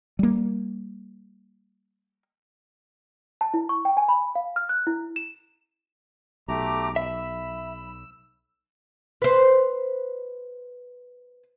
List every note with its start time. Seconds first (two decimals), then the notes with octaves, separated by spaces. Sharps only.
0.19 G3 A#3
3.41 A5
3.54 E4
3.69 C#6
3.85 G5
3.97 G#5
4.08 B5
4.35 F5
4.56 F6
4.69 F#6
4.87 E4
5.16 E7
6.48 B1 A3 G4 A#5 D6
6.96 E5 B5 E6
9.22 B4 C5